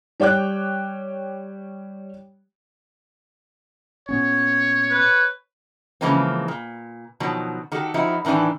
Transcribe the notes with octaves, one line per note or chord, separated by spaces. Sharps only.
G3 C#5 G5 D6 F#6
A#2 B3 C#4 C#5
B4
C#3 E3 F3 G#3 A#3 C4
A#2
B2 D#3 F3 F#3
D#3 F#4 G4 A4
F3 D#4 E4 F#4
A2 D#3 E3 D4 G#5